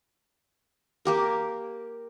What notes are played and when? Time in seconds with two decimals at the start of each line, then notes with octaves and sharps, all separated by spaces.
1.05 A#3 G4 A#4